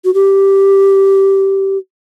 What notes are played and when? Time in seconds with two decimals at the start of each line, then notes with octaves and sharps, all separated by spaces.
0.05 F#4
0.14 G4